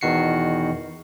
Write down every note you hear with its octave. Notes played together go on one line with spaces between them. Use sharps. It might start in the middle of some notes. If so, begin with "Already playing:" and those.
E2 B2 D#3 F#4 C7 C#7